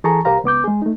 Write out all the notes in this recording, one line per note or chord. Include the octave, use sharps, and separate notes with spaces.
E3 G#4 A4 A5 A#5 C#6
C2 G4 A#4 C5 F5 A#5
C#2 B3 D6 G6
G#3 G#4
A3 D#4